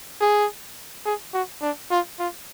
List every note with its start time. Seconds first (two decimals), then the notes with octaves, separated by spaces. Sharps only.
0.21 G#4
1.05 G#4
1.33 F#4
1.62 D4
1.91 F4
2.19 F4